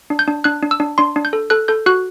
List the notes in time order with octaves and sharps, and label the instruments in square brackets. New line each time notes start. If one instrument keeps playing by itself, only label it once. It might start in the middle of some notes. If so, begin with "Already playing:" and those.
[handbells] D4
G6
D4
D4 F#6
D4
E6
D4
D4 C6
D4
G6
A4
A4 F#6
A4 G6
F#4 F#6